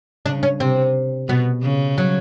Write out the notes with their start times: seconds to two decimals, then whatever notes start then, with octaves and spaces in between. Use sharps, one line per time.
0.26 C#3 D4
0.43 C#4
0.60 C3 C4
1.28 B2 B3
1.63 C#3
1.98 F#3